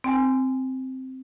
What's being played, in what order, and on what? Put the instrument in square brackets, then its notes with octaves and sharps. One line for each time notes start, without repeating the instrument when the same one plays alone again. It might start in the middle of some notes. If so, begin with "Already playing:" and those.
[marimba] C4 G5 G#5